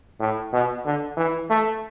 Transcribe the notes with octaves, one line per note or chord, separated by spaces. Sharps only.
A2
B2
D3
E3
A3